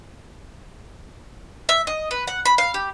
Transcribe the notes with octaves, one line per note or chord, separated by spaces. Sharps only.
E5
D#5
B4
F#5
B5
F5
G4